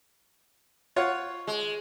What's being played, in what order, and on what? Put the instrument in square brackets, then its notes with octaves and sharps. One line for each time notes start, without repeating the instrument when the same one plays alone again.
[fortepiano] F4 C#5 F#5
[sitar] G#3